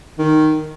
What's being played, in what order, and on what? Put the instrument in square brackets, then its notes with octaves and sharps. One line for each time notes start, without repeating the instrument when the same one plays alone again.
[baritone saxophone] D#3